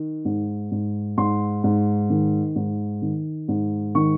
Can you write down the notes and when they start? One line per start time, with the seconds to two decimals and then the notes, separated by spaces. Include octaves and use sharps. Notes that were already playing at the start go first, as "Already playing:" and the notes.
Already playing: D#3
0.25 G#2
0.71 G#2
1.17 G#2 C6
1.64 G#2
2.10 D#3
2.56 G#2
3.02 D#3
3.48 G#2
3.95 D#3 C#6